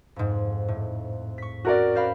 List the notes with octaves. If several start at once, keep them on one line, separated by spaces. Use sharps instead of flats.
F2 G#2
A2
C#6 B6
C#4 F#4 A#4 D5
C5 F5 B5